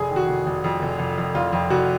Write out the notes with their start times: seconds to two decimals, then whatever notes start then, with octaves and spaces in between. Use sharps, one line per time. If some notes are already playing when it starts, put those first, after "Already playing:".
Already playing: F1 G#4
0.11 D#3
0.16 F#4
0.28 F1
0.47 F1
0.64 F2
0.82 F1
0.99 F1
1.18 F2
1.35 F1 F4
1.53 F2
1.70 F1 F#4